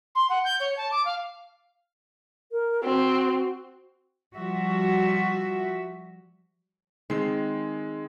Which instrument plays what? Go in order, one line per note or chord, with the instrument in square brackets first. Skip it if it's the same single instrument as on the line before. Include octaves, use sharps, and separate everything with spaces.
[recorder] C6
F#5
G6
C#5
A5
D6
F5
[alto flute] A#4
[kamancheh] C4 [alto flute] F#4
[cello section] F3 G3 F#4 E5
[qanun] D#3 [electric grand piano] G#3 C4 C7